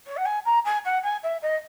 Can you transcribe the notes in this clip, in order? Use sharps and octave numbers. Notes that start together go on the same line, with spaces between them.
C#5
F#5
G#5
A#5
G#5
F#5
G#5
E5
D#5